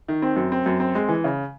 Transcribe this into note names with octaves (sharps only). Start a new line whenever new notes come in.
D#3
C4
F#2
C4
F#2
C4
G#3
E3
C#3